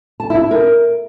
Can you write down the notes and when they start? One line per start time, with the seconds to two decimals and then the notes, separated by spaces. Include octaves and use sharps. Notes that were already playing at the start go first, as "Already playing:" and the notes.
0.20 A5
0.30 E4
0.40 E4
0.51 A#4